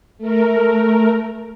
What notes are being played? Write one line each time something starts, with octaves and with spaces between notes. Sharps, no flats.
A3 A#4